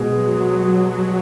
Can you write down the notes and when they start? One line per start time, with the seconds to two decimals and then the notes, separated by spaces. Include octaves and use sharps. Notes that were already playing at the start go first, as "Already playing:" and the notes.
Already playing: B2 G#3
0.14 F#3